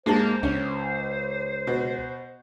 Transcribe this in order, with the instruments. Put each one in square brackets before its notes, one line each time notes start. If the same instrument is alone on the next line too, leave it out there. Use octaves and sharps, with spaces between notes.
[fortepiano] G#2 G#3 A5 [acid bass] A#3 [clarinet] C5
[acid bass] C#2 [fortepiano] C#4
[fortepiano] B2